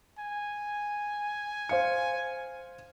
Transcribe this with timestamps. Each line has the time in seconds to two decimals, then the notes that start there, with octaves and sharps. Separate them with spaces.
0.18 G#5
1.69 C5 F5 C#7